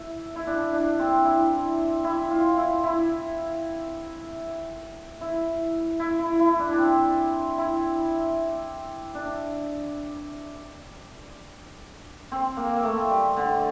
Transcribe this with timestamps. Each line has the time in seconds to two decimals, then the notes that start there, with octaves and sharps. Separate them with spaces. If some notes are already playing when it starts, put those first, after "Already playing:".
Already playing: E4
0.36 E4
0.47 D4
0.73 D4
0.99 C4
1.25 E4
2.05 E4
2.31 F4
2.57 E4
2.84 E4
5.21 E4
6.00 E4
6.19 E4
6.39 E4
6.59 D4
6.73 D4
6.78 C4
7.58 E4
9.15 D4
12.32 C4
12.57 A#3
12.76 A#3
12.84 A3
13.10 G3
13.37 D3